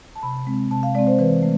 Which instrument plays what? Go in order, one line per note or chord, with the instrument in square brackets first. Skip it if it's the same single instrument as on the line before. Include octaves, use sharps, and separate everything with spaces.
[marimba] A5
C3 B5
G#3 C4
C3 A5
F5
G#3 D5
C4
C5
E3 B4
A3